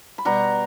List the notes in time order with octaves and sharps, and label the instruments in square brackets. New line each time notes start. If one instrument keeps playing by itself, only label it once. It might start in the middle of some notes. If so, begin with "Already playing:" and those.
[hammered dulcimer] B5
B2 G3 F#5 A#5